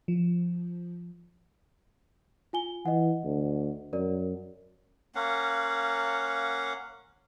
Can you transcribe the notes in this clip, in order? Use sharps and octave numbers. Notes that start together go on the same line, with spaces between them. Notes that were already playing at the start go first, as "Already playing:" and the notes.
F3
F4 G#5 G7
E3 D#5 F#5
D2
F#2 A#4 D5
A#3 C#4 F5 F#5